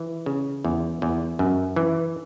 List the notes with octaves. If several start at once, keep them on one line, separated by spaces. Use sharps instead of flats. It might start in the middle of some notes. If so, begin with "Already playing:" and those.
Already playing: E3
C#3
E2
E2
F#2
E3